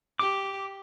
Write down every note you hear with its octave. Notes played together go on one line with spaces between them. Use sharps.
G4 D6